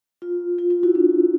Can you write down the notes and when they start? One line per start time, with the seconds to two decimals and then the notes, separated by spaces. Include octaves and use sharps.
0.22 F4
0.58 F4
0.70 F4
0.83 E4 F#4
0.95 D4